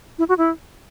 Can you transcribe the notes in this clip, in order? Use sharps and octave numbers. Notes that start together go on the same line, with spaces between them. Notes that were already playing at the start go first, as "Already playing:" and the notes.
E4
F#4
E4